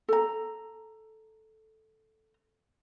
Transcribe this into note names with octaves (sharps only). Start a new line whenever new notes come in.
A4 A#5